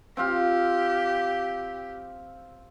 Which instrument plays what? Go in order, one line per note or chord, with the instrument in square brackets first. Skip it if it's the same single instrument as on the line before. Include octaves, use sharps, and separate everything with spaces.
[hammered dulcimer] C4 F4 F5 [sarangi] G4